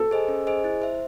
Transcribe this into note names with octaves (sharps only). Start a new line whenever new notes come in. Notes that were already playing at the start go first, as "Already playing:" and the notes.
Already playing: A4
G#4 C5 D#5 G#5
C#4
G#4 C5 D#5 G#5
E4
C5 E5